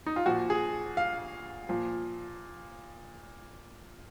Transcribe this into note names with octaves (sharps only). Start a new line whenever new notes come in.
D#4
F4
A#2 F3 F#4
G#4
F5
A#2 F3